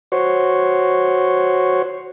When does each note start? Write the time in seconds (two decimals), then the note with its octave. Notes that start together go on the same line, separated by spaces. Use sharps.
0.12 F#4 C5 C#5